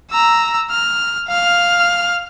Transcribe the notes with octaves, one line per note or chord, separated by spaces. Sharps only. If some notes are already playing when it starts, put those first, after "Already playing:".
A#5 E6
F6
F5 F6